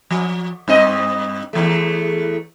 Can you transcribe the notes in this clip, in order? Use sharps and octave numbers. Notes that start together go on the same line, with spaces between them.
F3
G2 C4 D#5
E2 E3 A3